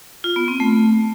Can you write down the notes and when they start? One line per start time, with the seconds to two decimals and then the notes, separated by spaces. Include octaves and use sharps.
0.24 F4
0.36 B3
0.48 C4
0.60 A3